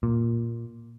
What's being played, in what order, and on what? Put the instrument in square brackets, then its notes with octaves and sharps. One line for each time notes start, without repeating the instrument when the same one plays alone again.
[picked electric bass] A#2